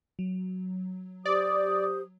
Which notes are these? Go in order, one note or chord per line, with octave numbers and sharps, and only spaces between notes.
F#3
G4 C5 D5 D#6